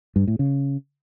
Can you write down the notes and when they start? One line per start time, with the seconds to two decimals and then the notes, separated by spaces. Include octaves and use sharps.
0.16 G2
0.27 A2
0.39 C#3